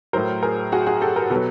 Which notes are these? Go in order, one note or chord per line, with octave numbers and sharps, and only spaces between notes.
A2 F#3 A#4 C5
G#4 A#4
F#4 G#4
F#4 G#4
G4 A4
G#4 A#4
B2 F#3 A4 B4